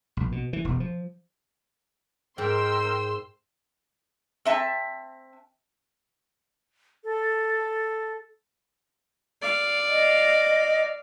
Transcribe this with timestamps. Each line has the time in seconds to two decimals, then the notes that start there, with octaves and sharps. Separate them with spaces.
0.17 A#1
0.32 B2
0.53 E3
0.65 E1
0.80 F3
2.38 G#2 A#4 G5 C6 E6
4.45 C4 E5 A5
7.04 A4
9.41 D5 F5
9.88 D#5